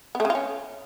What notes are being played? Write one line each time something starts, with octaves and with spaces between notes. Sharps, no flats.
B3
A3
C#3
F4
C#4